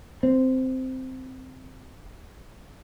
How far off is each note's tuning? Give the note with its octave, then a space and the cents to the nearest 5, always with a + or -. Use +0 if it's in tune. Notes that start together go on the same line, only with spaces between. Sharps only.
C4 -10